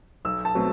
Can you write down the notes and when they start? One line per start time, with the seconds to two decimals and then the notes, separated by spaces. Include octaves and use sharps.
0.25 B1 E6
0.45 A5
0.55 B2 F#3 A3 C4